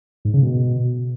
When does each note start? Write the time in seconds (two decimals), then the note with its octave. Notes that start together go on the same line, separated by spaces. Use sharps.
0.25 G#2
0.34 C#3
0.42 B2